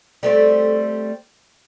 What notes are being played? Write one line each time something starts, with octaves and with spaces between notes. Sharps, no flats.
G3 A3 C4